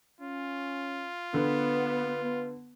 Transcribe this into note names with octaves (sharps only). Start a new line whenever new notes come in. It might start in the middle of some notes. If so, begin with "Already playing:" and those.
C#4 F4
D3 B3 B4